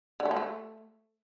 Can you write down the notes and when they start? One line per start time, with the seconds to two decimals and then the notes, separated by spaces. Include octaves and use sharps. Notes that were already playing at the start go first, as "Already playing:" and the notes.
0.20 D3
0.25 A3
0.31 F3
0.36 A3